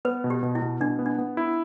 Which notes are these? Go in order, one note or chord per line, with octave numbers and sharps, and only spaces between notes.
B3 B4
B2
G4
B2
E4
B2
B2 D4
B3
D4
B3
E4